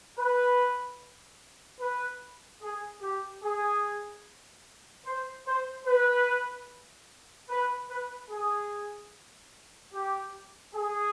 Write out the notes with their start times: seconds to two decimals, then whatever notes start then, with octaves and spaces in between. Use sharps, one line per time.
0.18 B4
1.80 B4
2.62 G#4
3.02 G4
3.43 G#4
5.06 C5
5.47 C5
5.87 B4
7.50 B4
7.90 B4
8.31 G#4
9.94 G4
10.75 G#4